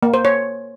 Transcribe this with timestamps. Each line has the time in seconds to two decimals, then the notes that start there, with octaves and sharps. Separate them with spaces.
0.03 A#3
0.14 C5
0.25 C#5